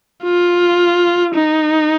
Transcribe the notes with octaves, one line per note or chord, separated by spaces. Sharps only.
F4
D#4